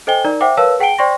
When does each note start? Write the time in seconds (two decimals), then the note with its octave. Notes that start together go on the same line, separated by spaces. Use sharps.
0.07 A4 C5 D#5 G5 G#5 G7
0.25 D#4 A#4 D5 A#5
0.41 C5 E5 F#5 G5 D6
0.57 A#4 B4 C#5 F5 A5 E6
0.80 G#4 F#5 G5 A5 D7 G7
0.98 C5 D5 G5 C6 C#6 A#6